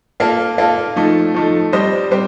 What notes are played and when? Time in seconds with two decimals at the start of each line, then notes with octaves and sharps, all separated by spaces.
0.20 A#3 F4 A4
0.58 A#3 F4 A4
0.96 F3 A3 D#4
1.34 F3 A3 D#4
1.73 G3 C4 G4 C5 D#5
2.11 G3 C4 G4 C5